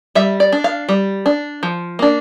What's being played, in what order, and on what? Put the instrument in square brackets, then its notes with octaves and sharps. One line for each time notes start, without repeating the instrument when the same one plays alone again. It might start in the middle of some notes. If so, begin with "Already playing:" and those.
[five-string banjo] G3 E5
D5
D4
F5
G3
D4
F3
A#3 D4